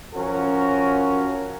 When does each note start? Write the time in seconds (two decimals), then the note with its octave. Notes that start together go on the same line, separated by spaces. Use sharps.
0.14 F3 C#4 F#4 A#4